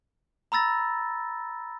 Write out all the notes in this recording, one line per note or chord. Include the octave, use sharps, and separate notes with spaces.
A#5 B5 E6 A6 A#6